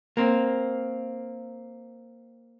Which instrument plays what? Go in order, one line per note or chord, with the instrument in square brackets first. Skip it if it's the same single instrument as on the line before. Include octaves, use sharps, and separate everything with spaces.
[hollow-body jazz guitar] A#3 C4